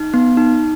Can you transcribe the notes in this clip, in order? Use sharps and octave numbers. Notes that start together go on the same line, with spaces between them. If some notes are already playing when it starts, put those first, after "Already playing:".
Already playing: D#4
B3
D#4